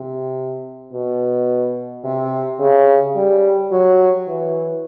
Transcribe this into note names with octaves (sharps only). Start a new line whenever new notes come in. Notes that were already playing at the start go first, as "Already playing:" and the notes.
Already playing: C3
B2
C3
C#3
G3
F#3
E3